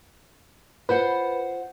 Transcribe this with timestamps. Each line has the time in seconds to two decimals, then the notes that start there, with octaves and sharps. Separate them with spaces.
0.89 F4 B4 C5 F#5